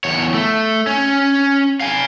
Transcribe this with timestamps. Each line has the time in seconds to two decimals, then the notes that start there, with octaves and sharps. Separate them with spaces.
0.04 E2 C#5
0.34 A3
0.87 C#4
1.81 F5 G#5